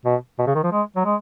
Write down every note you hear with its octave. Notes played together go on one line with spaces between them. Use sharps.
B2
B2
C#3
D#3
F3
G#3
F#3
G#3